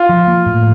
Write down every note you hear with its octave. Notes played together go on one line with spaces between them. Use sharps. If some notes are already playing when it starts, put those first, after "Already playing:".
Already playing: F4
F3
A#3
A2